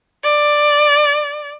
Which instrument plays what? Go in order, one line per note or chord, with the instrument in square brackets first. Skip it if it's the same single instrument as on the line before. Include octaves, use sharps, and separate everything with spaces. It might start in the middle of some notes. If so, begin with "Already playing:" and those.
[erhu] D5